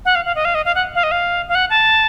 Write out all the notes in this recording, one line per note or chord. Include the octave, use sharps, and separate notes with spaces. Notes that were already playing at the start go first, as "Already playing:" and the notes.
F#5
F5
F5
D#5
F5
D#5
F5
F#5
F5
D#5
F5
F5
F#5
A5